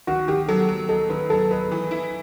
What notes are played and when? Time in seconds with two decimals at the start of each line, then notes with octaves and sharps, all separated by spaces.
0.07 D#3 F#4
0.28 D#3 G4
0.48 F#3 A4
0.69 F#3
0.89 D#4 A4
1.09 D#3 B4
1.30 F#3 A4
1.51 D#4 B4
1.72 E3
1.91 E4